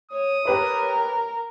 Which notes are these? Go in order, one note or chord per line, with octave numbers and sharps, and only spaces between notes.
C#5 D#6
G4 A#4 B4 C#5